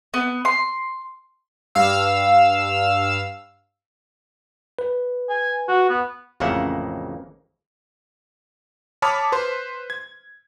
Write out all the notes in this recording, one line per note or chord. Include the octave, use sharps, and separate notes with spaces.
B3
C6
G2 F5 E6
B4
G#5
F#4
B3
A1 F2 C#3 A#3 E5 F#5
C#5 A5 B5 D6 D#6 F6
B4 C5 C6
G#6